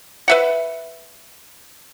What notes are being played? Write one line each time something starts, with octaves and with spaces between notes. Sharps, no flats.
B4 E5 F#5